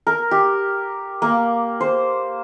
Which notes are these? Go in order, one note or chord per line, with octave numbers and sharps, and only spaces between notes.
A#4
G4
A#3
C5